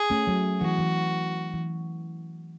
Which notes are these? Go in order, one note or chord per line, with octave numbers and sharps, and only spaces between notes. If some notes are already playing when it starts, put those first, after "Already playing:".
Already playing: G#4
A3 C#4
F#3
E3 F#4
E3
E3